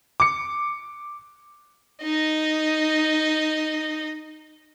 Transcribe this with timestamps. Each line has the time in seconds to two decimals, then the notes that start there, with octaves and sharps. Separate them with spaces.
0.20 D6 C#7
2.03 D#4 D#5